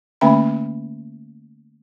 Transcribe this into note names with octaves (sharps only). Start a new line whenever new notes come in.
D3 A3 A#3 C#4 E5 B5